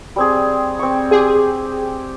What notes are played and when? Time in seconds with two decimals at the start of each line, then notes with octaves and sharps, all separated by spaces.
0.16 G3 C4 G#4
0.79 C4 C#6
1.11 G4 G#4 G#5